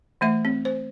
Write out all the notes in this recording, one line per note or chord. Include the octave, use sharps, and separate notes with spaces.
E3 A3 E5
C4
C5